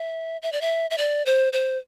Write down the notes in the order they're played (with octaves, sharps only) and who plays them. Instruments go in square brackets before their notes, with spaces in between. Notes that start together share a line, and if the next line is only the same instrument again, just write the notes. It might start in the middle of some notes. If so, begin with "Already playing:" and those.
Already playing: [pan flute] E5
E5
D5
E5
E5
D5
C5
C5